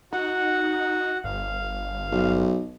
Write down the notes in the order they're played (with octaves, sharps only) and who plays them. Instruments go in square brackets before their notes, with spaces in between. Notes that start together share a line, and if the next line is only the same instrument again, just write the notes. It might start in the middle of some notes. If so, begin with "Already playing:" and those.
[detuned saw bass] D#4 [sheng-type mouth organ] F#4 F#5
[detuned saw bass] G1 [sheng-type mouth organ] F5
[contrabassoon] B1